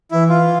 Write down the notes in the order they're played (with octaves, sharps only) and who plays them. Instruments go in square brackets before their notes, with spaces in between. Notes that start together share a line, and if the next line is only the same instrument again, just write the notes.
[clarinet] E3 [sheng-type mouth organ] E4
[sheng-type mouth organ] F4